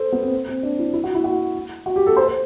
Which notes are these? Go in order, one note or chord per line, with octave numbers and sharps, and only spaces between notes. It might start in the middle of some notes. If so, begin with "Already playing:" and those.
Already playing: A4 C5
B3
C4
C4
D4
E4
E4
F#4
E4
F#4
F#4
G4
A4
C5
C5